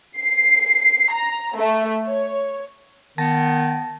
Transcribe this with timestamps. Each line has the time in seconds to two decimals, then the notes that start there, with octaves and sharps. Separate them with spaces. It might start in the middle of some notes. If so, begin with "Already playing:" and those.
0.19 C7
1.11 A#5
1.56 A3
2.06 C#5
3.18 D#3 B3 A5 A6 A#6